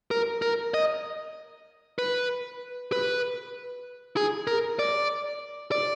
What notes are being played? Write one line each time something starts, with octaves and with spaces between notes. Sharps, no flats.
A#4
A#4
D#5
B4
B4
G#4
A#4
D5
D5